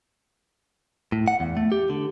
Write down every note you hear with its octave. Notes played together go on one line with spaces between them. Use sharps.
A2
F#5
E2
A3
G4
D3